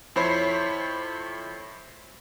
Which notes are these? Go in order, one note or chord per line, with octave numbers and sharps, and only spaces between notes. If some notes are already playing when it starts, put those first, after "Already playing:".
F2 E4 C5 C#5 B5 C7